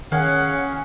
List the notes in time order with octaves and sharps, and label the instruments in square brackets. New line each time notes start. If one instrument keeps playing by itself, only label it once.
[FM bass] D#3 [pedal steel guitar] C#4 F5 [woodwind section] G#4 C#5 F#5